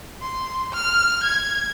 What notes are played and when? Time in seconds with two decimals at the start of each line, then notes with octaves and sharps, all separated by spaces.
0.22 C6
0.73 F6
1.24 G#6